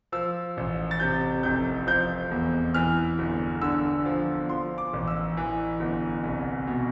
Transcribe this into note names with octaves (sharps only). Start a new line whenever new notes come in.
F3 E6
A1
A6
C3 G6
F1 G6
F3 G6
E2
E3 F6
G1
D3 E6
F3
F3 C6
D6
A1
E6
E3
G1
C2
B2